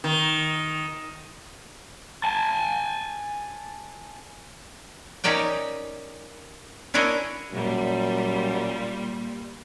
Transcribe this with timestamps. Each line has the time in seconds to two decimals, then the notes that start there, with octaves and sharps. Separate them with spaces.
0.04 D#3
2.24 G#5 A5
5.24 C#4 D#4 G4 A#4 D5 G5
6.94 C#4 D4 E4 A#4 C#5 D#5
7.52 F#2 A#2 G3